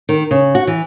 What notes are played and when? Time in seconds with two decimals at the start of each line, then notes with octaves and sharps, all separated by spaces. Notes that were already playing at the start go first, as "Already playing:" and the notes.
0.09 D#3
0.31 C#3
0.55 F#4
0.67 E3